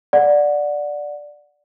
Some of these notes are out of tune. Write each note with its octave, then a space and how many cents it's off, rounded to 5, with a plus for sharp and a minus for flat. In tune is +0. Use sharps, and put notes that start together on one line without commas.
D5 +0 F#5 -15